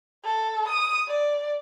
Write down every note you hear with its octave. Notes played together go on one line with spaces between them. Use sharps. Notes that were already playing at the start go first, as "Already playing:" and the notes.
A4
D#6
D5